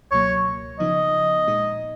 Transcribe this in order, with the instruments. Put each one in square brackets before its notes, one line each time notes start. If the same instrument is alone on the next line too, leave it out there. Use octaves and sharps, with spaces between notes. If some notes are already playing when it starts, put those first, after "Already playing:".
[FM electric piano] C#2 B2 F#3 A#3 [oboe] C#5
[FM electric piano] C#3 F3 B3 D#4 [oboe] D#5
[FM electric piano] A#2 G#3 D#4